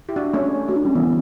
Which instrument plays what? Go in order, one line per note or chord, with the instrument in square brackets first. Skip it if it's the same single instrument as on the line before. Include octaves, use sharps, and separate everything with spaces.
[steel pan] E4 G4
D4 F#4
A3 C#4
[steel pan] A3 [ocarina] F#4
[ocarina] D4
[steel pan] G3 [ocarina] C#4
[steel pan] E3 [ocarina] B3
[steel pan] D3